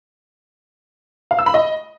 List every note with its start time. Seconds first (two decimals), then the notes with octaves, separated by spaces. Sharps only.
1.31 F5
1.39 E6
1.46 B5
1.54 D#5